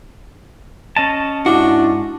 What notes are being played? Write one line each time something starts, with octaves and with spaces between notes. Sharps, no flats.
C#4 D#5 A5
G#2 D4 E4 F#4